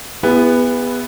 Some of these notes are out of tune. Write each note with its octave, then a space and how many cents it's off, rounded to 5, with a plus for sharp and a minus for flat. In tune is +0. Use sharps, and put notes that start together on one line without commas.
B3 +0 E4 +10 G#4 -40